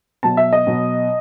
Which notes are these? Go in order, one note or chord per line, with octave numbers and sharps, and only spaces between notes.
B2 F#3 A5
E5
D#5
B2 F#3